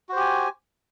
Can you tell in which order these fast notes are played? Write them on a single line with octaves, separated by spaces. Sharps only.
F#4 C5 G4 G#5